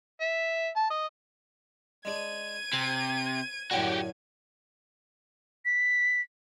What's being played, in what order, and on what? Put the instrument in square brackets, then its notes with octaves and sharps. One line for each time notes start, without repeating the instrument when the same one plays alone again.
[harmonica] E5
A5
D#5
[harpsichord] G#3 D4 [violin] G#6 D#7
[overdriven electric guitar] C3 [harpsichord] G#5
[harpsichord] F#2 A2 D3 [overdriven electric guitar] F#4 G4
[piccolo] B6